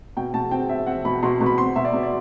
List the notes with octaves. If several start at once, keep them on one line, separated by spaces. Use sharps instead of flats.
B2 G5
B2 A5
C4 G5
C4 E5
C4 F#5
B2 B5
B2 C6
B2
B5
C4 C6
B2 E5
D5
B2
D5